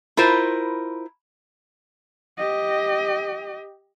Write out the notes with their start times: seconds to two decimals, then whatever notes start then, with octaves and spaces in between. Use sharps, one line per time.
0.17 E4 F4 A#4 C5
2.38 G4 D#5